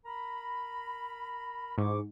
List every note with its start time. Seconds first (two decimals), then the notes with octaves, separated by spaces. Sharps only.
0.05 A#4 A#5 B5
1.78 G#2 E4 C#6 D6